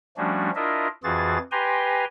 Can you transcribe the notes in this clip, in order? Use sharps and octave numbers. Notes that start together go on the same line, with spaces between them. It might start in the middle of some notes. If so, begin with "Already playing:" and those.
F3 G3 A3 C#4 D4 F#4
D4 E4 F4 A#4 D#5 E5
F2 E3 F4 F#4 G#4 A6
G4 B4 G5 G#5 A#5 C6